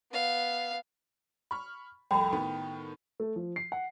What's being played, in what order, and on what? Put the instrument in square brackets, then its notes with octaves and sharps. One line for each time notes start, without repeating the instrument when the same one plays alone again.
[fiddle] B3 F5
[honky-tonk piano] B5 C#6 F6
[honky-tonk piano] C2 F2 A3 [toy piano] F#4 A#5 B5 [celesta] G5
[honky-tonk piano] A2 D#3 B3
[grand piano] A3
F3
C7
F#5